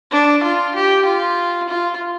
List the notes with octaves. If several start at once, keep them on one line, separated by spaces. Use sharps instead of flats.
D4
F4
G4
F4
F4